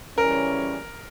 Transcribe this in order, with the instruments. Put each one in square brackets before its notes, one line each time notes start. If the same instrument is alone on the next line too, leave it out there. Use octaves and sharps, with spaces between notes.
[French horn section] C#3 E3 G3 C#4 [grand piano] A#4